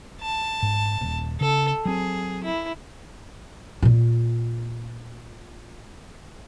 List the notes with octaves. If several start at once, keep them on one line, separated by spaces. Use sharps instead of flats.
A5
G#2
D#1
C#3 A4
F#3 C4 G#4
E4
A#2 F4